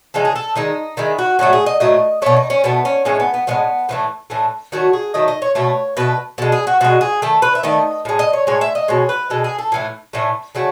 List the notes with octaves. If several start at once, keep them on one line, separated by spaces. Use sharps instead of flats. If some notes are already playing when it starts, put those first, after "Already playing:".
C#3 E3 G#3 A4
G#4
A4
D#3 G#3 D#4
D#3 G#3 E4
F#4
A2 F#3 A3 F#4
G#4
D#5
A2 F#3 A3 D#5
B2 A3 C#5
D#4
C#4
B2 A3 B3
C#4
A2 E3 G#3 C#4
B3
B3
A2 E3 G#3 B3
A2 E3 A3 B3
A2 E3 A3
D#3 F#3 A3 F#4
G#4
D#3 F#3 A3 D#5
D#5
C#5
B2 A3 C#5
B2 A3 B4
B2 G#3 A4
G#4
F#4
B2 G#3 F#4
G#4
D#3 A3 A4
B4
E5
D#3 A3 D#5
A2 G#3
D#5
C#5
A2 G#3 C#5
E5
D#5
B2 G#3 C#5
B4
B2 G#3 A4
G#4
A4
A2 E3 A3
A2 E3 A3
C#3 F#3 A3